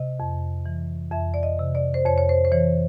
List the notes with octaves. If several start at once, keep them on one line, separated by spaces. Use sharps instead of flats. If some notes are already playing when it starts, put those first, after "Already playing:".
Already playing: C3 D#5
F2
E3
F2 E5
D5
D#5
C3
D5
C5
F2 C#5
C#5
C5
C5
E3 C#5